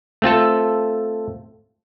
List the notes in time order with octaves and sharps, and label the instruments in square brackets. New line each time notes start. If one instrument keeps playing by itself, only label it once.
[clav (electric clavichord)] A3 C4 F4 A4